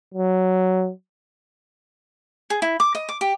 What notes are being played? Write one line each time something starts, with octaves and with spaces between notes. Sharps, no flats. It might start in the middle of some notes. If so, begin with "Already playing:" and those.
F#3
G#4
E4
D6
D#5
D6
G4